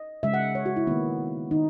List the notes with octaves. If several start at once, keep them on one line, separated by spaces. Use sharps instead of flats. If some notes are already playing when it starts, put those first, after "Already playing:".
Already playing: D#5
C#3 G#3 E5
F#5
C#5
F#4
E4
D#3 A#3 B3
D#3 D#4